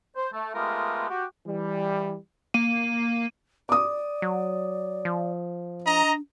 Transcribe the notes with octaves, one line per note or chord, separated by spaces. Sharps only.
C5
A3
G#3 A3 B3 F4 G4 A#4
F#4 G4
E3 G3
A#3 D#7
D5 D6 D#6
F#3
F3
D4 D#5 A#5